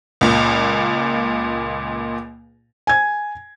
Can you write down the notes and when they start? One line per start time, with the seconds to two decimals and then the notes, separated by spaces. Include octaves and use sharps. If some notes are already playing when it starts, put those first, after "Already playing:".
0.21 C#2 A#2
2.87 G#5 G#6